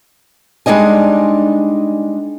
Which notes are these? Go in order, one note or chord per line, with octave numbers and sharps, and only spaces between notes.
G3 G#3 D4 D#4 D#5 G#5